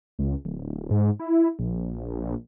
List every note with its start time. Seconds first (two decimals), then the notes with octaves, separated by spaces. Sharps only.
0.19 C#2
0.45 D1
0.91 G#2
1.19 E4
1.59 A#1